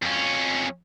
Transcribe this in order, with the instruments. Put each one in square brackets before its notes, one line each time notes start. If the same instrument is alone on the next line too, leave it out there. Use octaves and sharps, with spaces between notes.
[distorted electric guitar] F2 C#4